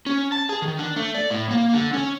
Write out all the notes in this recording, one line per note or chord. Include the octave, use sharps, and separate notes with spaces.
C#4
A5
G#4
D#3
D4
A3
D5
A2
A#3
D3
C#4